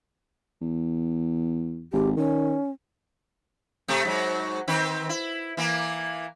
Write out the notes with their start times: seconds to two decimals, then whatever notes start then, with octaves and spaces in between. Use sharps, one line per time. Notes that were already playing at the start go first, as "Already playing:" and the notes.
0.61 E2
1.93 G#1 G4
2.17 D#3 C#4
3.88 C3 A3
4.05 G#2 F#3
4.68 D#3 C4 B4
5.09 E4
5.57 E3 A#3